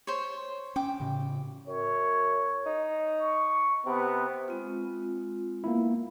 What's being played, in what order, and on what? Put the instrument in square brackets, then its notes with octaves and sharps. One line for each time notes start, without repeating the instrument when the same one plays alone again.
[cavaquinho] C5 C#5
[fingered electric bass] C#4 [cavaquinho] G5 D6
[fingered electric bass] A2 C#3
[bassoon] F#2 [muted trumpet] C#5
[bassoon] D#4
[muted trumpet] C#6
[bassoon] C3 [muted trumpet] B3
[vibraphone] G#3 C4 F4
[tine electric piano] A#3 B3 E4